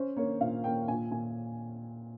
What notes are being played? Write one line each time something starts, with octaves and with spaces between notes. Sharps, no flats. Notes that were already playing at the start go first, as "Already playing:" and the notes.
Already playing: C#4 C5
A#3 C#5
A#2 F5
A#3 G5
A#2 G#5
A#2 G#5